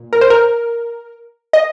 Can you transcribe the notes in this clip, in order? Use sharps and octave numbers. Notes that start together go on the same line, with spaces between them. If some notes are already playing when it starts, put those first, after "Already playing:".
Already playing: A#2
A#4
C5
A#4
D#5